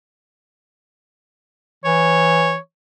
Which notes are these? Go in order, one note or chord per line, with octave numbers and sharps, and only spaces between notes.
E3 C#5